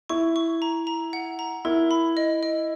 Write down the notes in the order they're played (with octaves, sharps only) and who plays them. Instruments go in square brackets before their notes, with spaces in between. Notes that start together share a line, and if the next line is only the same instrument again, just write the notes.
[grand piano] E4 [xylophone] C#6
[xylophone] C#6
A#5
A#5
F#5
A#5
[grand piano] E4 [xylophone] A#4
[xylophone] B5
D#5
D#5